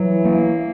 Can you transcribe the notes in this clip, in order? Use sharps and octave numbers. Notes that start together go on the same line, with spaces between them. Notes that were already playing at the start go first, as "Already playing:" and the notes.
Already playing: E3 F#3
A#3